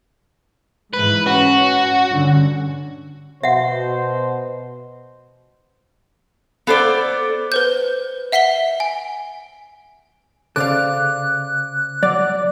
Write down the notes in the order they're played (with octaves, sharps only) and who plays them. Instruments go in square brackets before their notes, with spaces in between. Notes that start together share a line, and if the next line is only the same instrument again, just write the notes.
[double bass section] G#2 E3 [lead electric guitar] B4
[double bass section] C#4 [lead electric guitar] F#4
[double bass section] G2 D3 C#4
[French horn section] B2 [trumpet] C5 [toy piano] E5 F#5
[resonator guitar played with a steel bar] B3 A4 C5 D5
[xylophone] B4 C5 G6
E5 F#5 B6 C7 G7
G#5
[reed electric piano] C#3 C5 D6 [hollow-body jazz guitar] A4 D5 F5 [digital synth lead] F#6
[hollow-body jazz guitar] F#3 [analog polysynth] D5